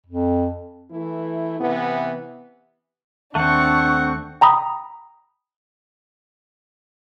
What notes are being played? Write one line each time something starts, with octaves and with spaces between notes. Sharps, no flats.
F2
E3 A3 E4
C3 E3 B3
D#2 A3 C4 D4 F#5 C#6
G5 A#5 B5 D#6